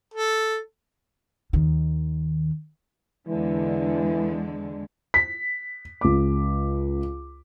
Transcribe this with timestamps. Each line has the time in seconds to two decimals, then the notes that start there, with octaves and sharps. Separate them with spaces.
0.14 A4
1.53 D#2 D#3
3.28 E2 D3 E3 G#3
5.14 B6
6.01 C#2 D6